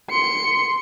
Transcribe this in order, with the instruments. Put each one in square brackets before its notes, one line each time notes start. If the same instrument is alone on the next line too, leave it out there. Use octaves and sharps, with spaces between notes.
[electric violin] C6 C#7